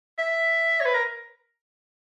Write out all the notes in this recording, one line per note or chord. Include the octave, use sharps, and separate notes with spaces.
E5
C#5
B4
A#4